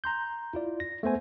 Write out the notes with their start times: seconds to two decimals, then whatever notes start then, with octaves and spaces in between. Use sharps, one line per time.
0.04 A#5 C6 G6
0.53 E4 F4 D5
0.80 A#6
1.03 A3 B3 C5 G#5